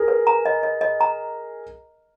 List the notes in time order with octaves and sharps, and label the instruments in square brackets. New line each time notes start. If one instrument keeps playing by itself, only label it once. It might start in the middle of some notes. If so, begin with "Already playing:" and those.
Already playing: [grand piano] G#4 A#4
[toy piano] B4
A#5
D#5
D#5
D#5
A#5